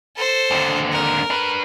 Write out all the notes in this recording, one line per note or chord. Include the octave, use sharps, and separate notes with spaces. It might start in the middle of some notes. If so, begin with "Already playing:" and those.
A4 C5
D#2 D3
A#4
D4 B4